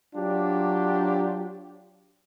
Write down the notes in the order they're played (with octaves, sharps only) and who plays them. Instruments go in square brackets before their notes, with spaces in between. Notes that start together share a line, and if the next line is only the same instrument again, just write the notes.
[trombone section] F#3 D4 F4 G4